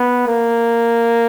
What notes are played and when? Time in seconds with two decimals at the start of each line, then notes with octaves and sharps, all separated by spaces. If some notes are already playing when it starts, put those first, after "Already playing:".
Already playing: B3
0.27 A#3